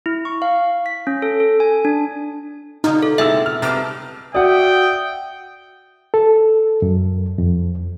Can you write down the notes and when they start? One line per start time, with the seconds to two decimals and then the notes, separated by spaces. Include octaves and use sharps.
0.06 E4
0.25 C#6
0.42 F5
0.86 B6
1.07 C#4
1.22 A4
1.40 A4
1.60 G#5
1.85 D4
2.84 B2 D3 D#4 F4
3.03 A4
3.18 F#1 B2 G#3 C4 E4 E5 E6
3.46 F6
3.62 C2 C3 D#4 A4 B4 D6 F6 A6
4.34 F#4 D5 E5 F#5 G5 D#6
6.14 A4
6.82 F#2
7.38 F2